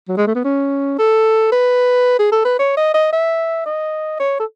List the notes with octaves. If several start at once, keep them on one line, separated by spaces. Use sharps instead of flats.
F#3
G#3
A3
B3
C#4
A4
B4
G#4
A4
B4
C#5
D#5
D#5
E5
D#5
C#5
A4